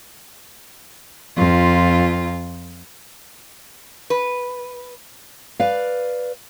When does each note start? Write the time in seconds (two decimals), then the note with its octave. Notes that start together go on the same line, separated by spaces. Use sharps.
1.36 F2 F4
4.10 B4
5.60 B4 D5 F5